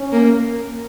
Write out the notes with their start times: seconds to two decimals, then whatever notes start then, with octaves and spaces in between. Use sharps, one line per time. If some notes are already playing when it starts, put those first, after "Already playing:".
Already playing: C#4
0.12 A#3